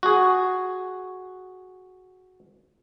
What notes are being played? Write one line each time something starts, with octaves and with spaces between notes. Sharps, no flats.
F#4 G#4